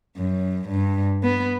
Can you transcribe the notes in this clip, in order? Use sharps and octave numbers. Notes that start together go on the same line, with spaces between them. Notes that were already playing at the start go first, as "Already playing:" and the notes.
F#2
G2
B3